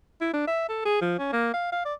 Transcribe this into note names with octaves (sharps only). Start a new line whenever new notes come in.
E4
D4
E5
A4
G#4
F3
C#4
A#3
F5
F5
D5